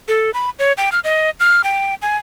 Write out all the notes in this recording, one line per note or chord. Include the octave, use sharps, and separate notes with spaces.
A4
B5
C#5
G5
F6
D#5
F6
G5
G#5